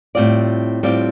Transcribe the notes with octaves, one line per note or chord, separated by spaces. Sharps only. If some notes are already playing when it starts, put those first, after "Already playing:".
A2 G3 C4 F4 D5
A2 G3 C4 F4 D5